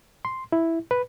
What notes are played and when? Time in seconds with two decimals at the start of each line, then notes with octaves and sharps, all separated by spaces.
0.25 C6
0.52 E4
0.91 B4